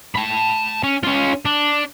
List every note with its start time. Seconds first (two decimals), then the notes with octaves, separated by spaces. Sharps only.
0.15 A5 B5
0.83 C#4
1.03 C#4 F4
1.45 D4